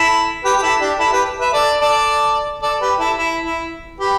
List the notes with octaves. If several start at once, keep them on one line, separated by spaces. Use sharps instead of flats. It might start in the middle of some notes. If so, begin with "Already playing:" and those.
Already playing: E4 A4
G4 B4
G4
E4 A4
D4 G4
E4 A4
G4 B4
B4 E5
A4 D5
A4 D5
A4 D5
G4 B4
E4 A4
E4
E4
G4 B4